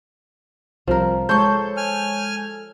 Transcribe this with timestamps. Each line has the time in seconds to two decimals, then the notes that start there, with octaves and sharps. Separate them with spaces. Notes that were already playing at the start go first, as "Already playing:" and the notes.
0.87 C2 F3 A#4
1.29 G#3 A4 C5 C#5 C#6 G6
1.77 G#5 F6